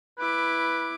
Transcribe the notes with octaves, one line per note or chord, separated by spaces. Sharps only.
E4 B4 D6